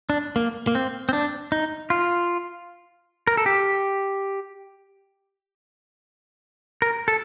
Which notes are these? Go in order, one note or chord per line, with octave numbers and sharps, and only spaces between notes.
D4
A#3
A#3
C4
C4
D4
D#4
F4
A#4
A4
G4
A#4
A4